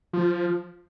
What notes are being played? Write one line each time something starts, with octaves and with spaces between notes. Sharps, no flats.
F3